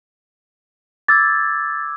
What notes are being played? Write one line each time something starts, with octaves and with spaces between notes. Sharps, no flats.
D6 E6 G#6 A6